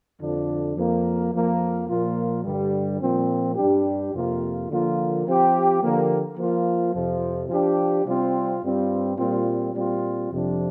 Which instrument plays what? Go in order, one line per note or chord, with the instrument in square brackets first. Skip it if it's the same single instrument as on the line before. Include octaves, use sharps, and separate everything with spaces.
[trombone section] F2 D3 F3 D4
F2 F3 A#3
F2 F3 A#3
A#2 F3 A#3 F4
G2 D3 G3
A#2 F3 C4
G2 G3 D4 G4
F2 C3 A#3 F4
D3 F3 A#3 F4
F3 C4 G4
D3 F3 A#3 G4
F3 A#3 F4
F2 C3 F3
F3 D4 G4
C3 G3 C4 F4
G2 G3 C4 F4
A#2 G3 C4 F4
A#2 G3 C4 F4
F2 C3 F3 D4